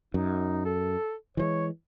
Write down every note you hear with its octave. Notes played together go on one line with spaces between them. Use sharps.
F#2 D#4
A4
E3 F3 G#3 C#5